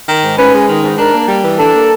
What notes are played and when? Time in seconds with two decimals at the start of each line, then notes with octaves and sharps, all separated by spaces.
0.09 D#3
0.24 G#2
0.38 C#4 B4
0.53 G#3
0.69 D#3
0.83 G#2
0.98 D4 A#4
1.14 A#3
1.28 G3
1.44 E3
1.59 D4 A4
1.74 A#3